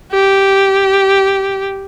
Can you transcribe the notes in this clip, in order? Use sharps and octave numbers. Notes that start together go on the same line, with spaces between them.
G4